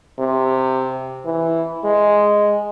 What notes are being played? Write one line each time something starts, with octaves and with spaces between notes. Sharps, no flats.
C3
E3
G#3